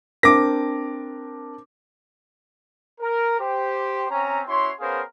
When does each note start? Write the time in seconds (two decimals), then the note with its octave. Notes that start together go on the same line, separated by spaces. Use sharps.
0.23 C4 D4 A#4 D6 A#6
3.01 A#4
3.39 G4 C5
4.10 C4 C#4 A#5
4.47 C#4 E4 F#4 C#5 C6
4.80 B3 C#4 G#4 A#4 C5 F5